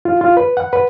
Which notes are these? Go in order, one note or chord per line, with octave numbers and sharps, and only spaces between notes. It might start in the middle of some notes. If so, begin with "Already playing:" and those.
F4
F4
B4
F#5
B4